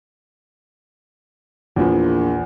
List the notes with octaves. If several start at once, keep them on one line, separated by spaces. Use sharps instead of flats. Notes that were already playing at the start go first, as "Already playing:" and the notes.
A#1 E2 F3